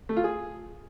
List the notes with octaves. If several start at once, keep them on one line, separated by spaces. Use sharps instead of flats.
A3
F4
G#4